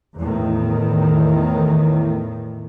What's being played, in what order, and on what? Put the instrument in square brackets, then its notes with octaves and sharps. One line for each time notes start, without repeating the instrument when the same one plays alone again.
[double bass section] E2 A2 D#3